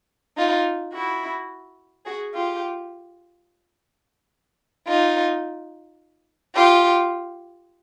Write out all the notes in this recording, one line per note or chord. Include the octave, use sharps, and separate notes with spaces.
D#4 F4
E4 F#4
F#4 G#4
F4 G4
D#4 F4
F4 G4